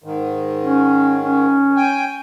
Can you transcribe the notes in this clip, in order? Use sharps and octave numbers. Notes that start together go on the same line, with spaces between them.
G#2 D#3
C#4
C#4
G5 G#5